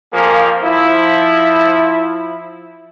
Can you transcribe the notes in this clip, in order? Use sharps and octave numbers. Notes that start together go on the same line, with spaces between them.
F2 F3 A#3 G#4 A#4
F3 E4